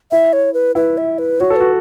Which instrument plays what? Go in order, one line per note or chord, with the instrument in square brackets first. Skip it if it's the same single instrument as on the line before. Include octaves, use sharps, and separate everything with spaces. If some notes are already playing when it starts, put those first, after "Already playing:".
[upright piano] E4 [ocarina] E5
[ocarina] C#5
B4
[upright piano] E4 [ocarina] B4
[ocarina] E5
B4
[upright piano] F#4 [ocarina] C#5
[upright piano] A4
[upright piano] F#4 [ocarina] B4